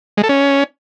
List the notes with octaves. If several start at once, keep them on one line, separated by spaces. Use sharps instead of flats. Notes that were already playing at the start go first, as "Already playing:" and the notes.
G#3
A4
C#4